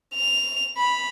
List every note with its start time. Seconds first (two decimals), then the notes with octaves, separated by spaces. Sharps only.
0.15 F7
0.78 B5